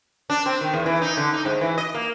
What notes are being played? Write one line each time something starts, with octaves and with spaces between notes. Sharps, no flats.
D4
C4
D#3
E2
E3
D#4
D3
D#4
G#2
E3
D#5
A#3